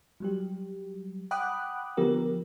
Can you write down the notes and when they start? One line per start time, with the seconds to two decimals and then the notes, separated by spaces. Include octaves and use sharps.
0.20 F#3 G3 G4
1.31 F#5 G5 B5 D6 D#6 F#6
1.97 D3 F3 B3 G4 A#4